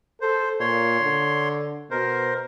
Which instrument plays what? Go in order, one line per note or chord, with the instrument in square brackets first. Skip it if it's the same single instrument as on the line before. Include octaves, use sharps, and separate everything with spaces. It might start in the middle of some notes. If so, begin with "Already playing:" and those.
[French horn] A4 [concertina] C5
[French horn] A#2 [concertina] C#5 C6
[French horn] D3
[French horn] B2 [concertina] A#4 C5